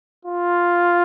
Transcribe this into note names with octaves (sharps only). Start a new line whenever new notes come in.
F4